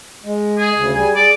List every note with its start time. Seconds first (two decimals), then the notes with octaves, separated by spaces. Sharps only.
0.24 G#3
0.58 G#4
0.75 D2 C#3
0.94 G3 G#4 G#5
1.15 G#4 D5